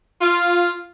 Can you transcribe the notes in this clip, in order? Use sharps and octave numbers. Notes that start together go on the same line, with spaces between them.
F4